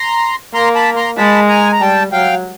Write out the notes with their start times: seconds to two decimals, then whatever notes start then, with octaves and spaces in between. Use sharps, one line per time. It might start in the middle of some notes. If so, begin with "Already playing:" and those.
Already playing: A#5 C6
0.54 A#3 A#5 C6
0.75 A5 B5
0.96 A#5 C6
1.18 G#3 A5 B5
1.49 G#5 A#5
1.72 A#5
1.80 G3 G5 A5
2.12 F#3 F5 G5